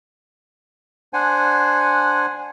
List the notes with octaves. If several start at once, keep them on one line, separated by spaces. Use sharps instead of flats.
D4 C5 F#5 G#5